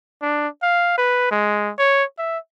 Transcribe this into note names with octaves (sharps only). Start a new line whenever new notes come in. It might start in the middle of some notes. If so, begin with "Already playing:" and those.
D4
F5
B4
G#3
C#5
E5